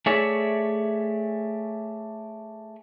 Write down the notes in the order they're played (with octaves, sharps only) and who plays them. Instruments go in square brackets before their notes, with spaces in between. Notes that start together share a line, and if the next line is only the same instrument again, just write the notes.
[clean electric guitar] A3 G#4 C#5 D5 E5